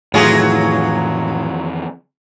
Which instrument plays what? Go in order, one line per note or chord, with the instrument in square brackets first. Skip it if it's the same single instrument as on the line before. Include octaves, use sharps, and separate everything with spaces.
[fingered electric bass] F2 D#3 E3 [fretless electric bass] A2 [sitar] F#3 F4 G#4